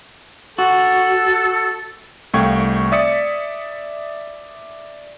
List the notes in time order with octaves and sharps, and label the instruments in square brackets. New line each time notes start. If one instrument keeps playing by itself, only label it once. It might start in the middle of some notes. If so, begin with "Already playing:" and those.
[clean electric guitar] F#4 [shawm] A4
[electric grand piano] C2 A3 F5 G5 C#6 G#6
D5 E5 D#6 A6 B6 C#7